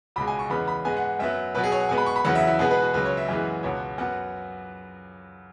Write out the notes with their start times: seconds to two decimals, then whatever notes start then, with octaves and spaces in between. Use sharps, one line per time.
0.16 C#2 B2 G#3 B5
0.27 G#5
0.39 C#6
0.50 E2 C#3 G#3 B3 B5
0.68 B5
0.85 G#2 G#3 B3 G#5
0.97 F#5
1.19 F#2 F#3 B3 E5
1.55 B2 F#3 B3 B4
1.64 G#4
1.72 C#5
1.80 F#5
1.89 B2 G#3 B3 G#5
1.98 B5
2.06 C#6
2.16 B5
2.25 E2 C#3 F#3 B3 F#5
2.35 E5
2.47 E4
2.59 B2 G#3 B3 G#4
2.71 B4
2.82 F#4
2.94 C#2 C#3 F#3 B4
3.05 C#5
3.17 E5
3.29 F#2 E3 G#3 B3
3.63 C#2 B2 B3 C#5
3.98 F#2 F#3 B3 F#5